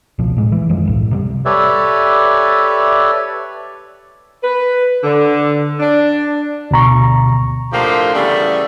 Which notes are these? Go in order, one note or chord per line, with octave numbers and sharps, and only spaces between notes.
G#1 C#2 B2 F3
A2 G#3
E3
F#2 D#3 F3 G#3
E1 C2 A2
C3 F#3 G3
G4 A4 B4 C#5 D5 E5
B4
D3
D4
D2 B2 A#5 C#6
A2 D3 F3 A#3 G4 C6
C#3 E3 G3 A3 B3